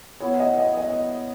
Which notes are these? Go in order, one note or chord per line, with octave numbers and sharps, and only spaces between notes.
B3 E4 B4 C#5 E5
D#5
D#5
D#5